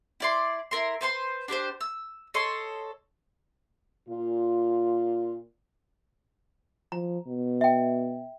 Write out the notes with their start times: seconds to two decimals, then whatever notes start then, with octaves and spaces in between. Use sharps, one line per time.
0.20 E4 D5 C6
0.71 E4 A#4 C6
1.01 B4 C5 G#5 C6
1.48 D4 G4 B4 C5
1.81 E6
2.34 A4 C#5 D#5 C6
4.09 A#2 F4
6.92 F3 A#5
7.27 B2
7.61 E5 G5